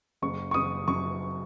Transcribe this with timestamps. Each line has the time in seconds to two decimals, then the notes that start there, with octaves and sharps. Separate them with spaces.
0.22 F#1 C#6
0.51 C#6
0.54 F#1 D#6
0.88 F#2 C#6